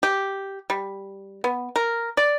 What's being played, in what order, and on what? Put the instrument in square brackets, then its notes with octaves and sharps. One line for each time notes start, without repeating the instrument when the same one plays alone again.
[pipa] G4
G3
B3
A#4
D5